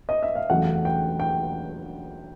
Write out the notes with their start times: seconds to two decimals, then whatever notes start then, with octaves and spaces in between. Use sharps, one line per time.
0.09 D#5
0.23 E5
0.35 F5
0.50 E2 C#3 F#3 A3 F#5
0.85 G5
1.20 G5